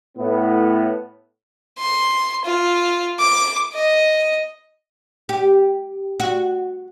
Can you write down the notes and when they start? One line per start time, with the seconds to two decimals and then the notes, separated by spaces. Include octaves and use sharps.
0.18 A2 B3
1.78 C6
2.44 F4
3.19 D6
3.73 D#5
5.29 G4
6.20 F#4